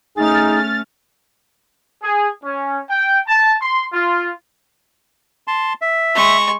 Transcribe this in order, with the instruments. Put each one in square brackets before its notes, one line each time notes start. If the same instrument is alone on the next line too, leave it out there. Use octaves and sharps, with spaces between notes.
[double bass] A3 C#4 [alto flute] D#4 [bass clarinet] G#4 [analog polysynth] F6 A6
[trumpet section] G#4
C#4
G5
A5
C6
F4
[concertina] A5 C6
E5
[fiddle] G#3 C#6